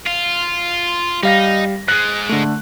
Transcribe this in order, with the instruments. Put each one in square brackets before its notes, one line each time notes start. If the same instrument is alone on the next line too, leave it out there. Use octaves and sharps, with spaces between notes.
[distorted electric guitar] F4
[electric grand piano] G3 F5 A#6 [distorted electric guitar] D#4
[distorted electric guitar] G#2 G#3 [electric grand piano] F#6
[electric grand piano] D3 A3